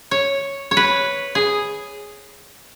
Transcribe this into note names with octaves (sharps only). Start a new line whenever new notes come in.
C#5
C#5
B4
G#4